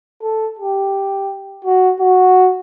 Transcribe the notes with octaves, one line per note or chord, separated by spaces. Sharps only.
A4
G4
F#4
F#4